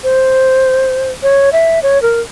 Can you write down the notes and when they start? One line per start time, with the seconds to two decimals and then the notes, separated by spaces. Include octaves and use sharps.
0.04 C5
1.23 C#5
1.53 E5
1.83 C#5
2.02 A#4